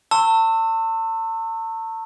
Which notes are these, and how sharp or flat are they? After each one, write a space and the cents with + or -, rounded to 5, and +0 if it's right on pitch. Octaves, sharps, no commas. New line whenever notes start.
A5 +40 C#6 -40 E6 -5